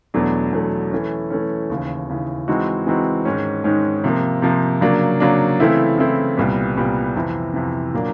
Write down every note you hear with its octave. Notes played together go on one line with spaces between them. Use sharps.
E2 B2 F#3 A3 D4
E2 B2 F#3 A3 D4
E3 A3 C#4
E3 A3 C#4
D#2 C#3 E3
D#2 C#3 E3
E3 G#3 C4 D#4 F#4
E3 G#3 C4 D#4 F#4
G#2 D#3 G#3 C#4
G#2 D#3 G#3 C#4
C3 F3 A#3
C3 F3 A#3
C#3 F#3 A#3 D4
C#3 F#3 A#3 D4
C#3 E3 A3 C4 E4
C#3 E3 A3 C4 E4
C2 A#2 G3 B3
C2 A#2 G3 B3
F2 C3 E3
F2 C3 E3
A#2 F#3 A#3 D4